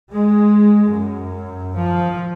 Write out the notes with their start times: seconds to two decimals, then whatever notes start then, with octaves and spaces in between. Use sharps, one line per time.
0.11 G#3
0.88 F#2
1.77 F3